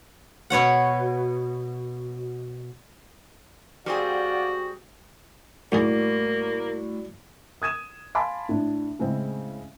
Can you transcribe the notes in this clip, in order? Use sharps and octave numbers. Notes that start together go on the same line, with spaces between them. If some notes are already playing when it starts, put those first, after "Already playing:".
B2 B4 C#5 F#5
G3 C4 F#4 G#4 D5 F5 F#5
B1 E2 A2 G3 A#3 F#4 G#4 D5
D#6 G#6 D#7 E7
F5 G#5 A5 B5 C6 D6
A2 D4
A2 C#3 G#3 C4 E4